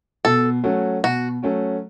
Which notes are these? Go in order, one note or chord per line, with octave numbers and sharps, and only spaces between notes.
B2 A4
F#3 A3 C#4 F#4
B2 F#4
F#3 A3 C#4 F#4